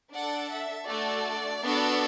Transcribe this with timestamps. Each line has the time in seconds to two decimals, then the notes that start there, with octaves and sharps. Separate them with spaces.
0.13 D4 A4 D5 F#5
0.51 E5
0.88 A3 D4 F#4 A4 D5
1.63 B3 D4 F#4 A4